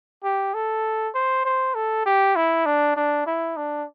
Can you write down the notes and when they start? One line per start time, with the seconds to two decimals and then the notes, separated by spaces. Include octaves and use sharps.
0.24 G4
0.54 A4
1.15 C5
1.45 C5
1.75 A4
2.06 G4
2.36 E4
2.66 D4
2.97 D4
3.27 E4
3.57 D4